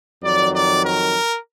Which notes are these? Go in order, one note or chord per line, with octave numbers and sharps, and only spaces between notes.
F2 D#3 F#3 D5
D5
A#4